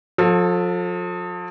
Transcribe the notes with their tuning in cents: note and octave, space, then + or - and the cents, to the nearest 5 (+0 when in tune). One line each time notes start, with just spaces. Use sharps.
F3 +35 A4 +0